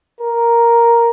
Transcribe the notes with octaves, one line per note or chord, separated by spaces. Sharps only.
A#4